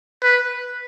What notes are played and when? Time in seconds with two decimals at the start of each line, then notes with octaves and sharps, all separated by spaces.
0.23 B4